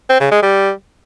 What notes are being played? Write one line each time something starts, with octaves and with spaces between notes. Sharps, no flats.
C4
C#3
G#3
G3